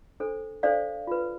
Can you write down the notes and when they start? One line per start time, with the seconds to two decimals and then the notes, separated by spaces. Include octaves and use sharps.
0.20 D4 A4 C5
0.63 D4 A4 C5 D5 F5
1.07 F4 B4